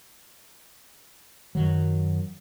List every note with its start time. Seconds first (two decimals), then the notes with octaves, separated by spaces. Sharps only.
1.55 F#2 D#3 F#3